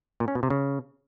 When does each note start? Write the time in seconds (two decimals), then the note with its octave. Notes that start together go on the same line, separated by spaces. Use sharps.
0.20 A#2
0.28 C#4
0.35 B2
0.43 C3
0.50 C#3